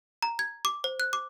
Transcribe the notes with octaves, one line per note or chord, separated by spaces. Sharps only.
A#5
G#6
D6
C5
F#6
D6